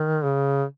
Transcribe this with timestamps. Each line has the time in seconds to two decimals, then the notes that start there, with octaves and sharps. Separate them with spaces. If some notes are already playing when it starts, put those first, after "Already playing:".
Already playing: D#3
0.24 C#3